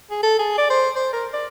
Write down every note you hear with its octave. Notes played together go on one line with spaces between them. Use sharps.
G#4
A4
G#4
D5
C5
C5
A#4
D5